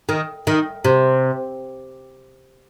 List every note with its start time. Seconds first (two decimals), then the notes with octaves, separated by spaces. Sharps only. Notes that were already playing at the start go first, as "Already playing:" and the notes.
0.09 D#3
0.47 D#3
0.84 C3